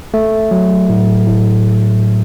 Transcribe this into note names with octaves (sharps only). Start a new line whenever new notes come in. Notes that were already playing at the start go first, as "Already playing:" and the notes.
A3
F#3
A2
A2